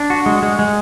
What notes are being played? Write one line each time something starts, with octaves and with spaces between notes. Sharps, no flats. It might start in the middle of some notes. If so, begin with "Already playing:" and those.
Already playing: D4
F#4
G#3
G#3
G#3